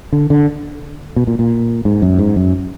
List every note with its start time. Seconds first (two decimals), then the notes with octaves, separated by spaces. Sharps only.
0.13 D3
0.30 D3
1.16 B2
1.27 A#2
1.39 A#2
1.85 G#2
2.02 F#2
2.19 G#2
2.36 F#2